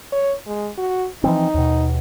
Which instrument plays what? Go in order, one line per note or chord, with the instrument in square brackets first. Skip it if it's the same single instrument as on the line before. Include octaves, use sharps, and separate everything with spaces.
[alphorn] C#5
G#3
F#4
[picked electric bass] E3 F3 C4 [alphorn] D#4
[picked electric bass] D#2 B2